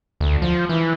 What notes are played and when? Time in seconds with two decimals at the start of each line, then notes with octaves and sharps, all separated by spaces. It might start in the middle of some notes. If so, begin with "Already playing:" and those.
0.21 D2
0.42 F3
0.69 E3